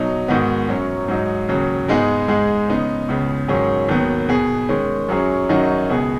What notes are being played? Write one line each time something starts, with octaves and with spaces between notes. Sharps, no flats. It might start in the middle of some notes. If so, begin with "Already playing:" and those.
Already playing: B2 F#3 D#4
G#2 D#3 B3 F#4
F#2 F#3 C#4
G#2 F#3 D#4
D#2 C#3 F#3
G#2 G#3 B3 D#4 G#4
G#2 G#3 D#4 G#4
C#3 B3 D#4
C#2 C#3 B3
G#2 D#3 F#3 C#4 G#4
D#2 D#3 F#3 B3
B2 B3 G#4
D#3 G#3 C#4
F#2 F#3 C#4 G#4
F#2 D#3 F#3 D#4 F#4
C#2 B2 B3 G#4